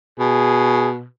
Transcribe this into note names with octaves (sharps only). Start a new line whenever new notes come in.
B2 G#4